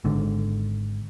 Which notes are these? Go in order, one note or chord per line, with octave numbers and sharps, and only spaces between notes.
G#1 G#2 D3